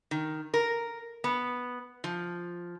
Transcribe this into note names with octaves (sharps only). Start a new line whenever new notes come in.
D#3
A#4
B3
F3